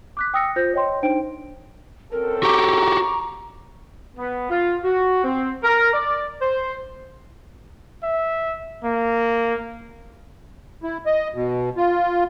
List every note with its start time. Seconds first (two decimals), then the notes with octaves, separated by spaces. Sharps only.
0.17 D6 F#6 B6
0.34 G5 D#6 E6 A#6 C#7
0.56 F4 C5 G6 A#6
0.74 C#5 D#5 G5 C6
1.02 D4 D#4 C5 G5 D7
2.12 F#2 C4 A4 A#4
2.43 F#4 G4 A#5 C#6 D6
4.17 B3
4.50 F4
4.84 F#4
5.24 C4
5.63 A#4
5.93 D5
6.41 C5
8.03 E5
8.84 A#3
10.83 E4
11.06 D#5
11.35 B2
11.77 F4